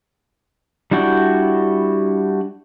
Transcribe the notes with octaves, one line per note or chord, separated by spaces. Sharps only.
G3 D4 E4 F#4 G5